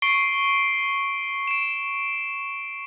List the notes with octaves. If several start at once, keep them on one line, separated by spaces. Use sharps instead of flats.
C#6 C7 D7 G7
D7 E7